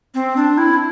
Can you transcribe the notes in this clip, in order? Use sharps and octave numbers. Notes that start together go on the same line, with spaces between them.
C4
D4
E4